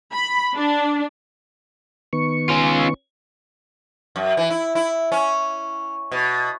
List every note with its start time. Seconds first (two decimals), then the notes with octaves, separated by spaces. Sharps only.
0.13 B5
0.56 D4
2.13 D#3 B3 C#6
2.49 C#4 F4
4.16 F#2
4.37 E3
4.50 E4
4.75 E4
5.12 C#4
6.12 B2